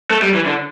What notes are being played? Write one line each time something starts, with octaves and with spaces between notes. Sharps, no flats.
A3
G3
E3
D3